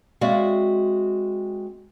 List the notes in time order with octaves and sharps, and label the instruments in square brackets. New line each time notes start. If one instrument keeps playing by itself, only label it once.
[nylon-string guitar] G#3 C4 F#4 D5 E5 F5